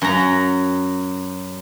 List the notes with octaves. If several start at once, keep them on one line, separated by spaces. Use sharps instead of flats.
F#2 A#5